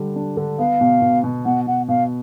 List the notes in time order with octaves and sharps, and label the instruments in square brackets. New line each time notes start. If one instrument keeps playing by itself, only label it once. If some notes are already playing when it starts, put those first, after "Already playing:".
Already playing: [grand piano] D3 G3 D4
D4
D3
[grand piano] B3 [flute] F5
[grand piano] B2
B2
B2
[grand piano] B2 [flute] F#5
[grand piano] B2 [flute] F#5
[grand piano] B2 [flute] F5